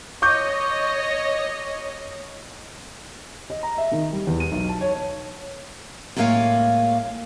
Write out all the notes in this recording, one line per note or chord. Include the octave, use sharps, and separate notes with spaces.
C#5 D#5 C#6 D6 G6
D#5
A#5
E5
D#3
G3
E2
D#7
B1
A5
C#5
A2 G#3 A#3 C#5 F5 G#5